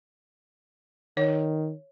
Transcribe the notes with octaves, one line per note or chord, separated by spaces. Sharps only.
D#3 C#5